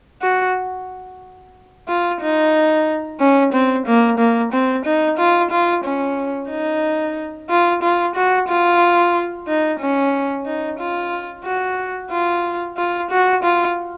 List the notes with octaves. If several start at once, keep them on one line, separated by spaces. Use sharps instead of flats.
F#4
F4
D#4
C#4
C4
A#3
A#3
C4
D#4
F4
F4
C#4
D#4
F4
F4
F#4
F4
D#4
C#4
D#4
F4
F#4
F4
F4
F#4
F4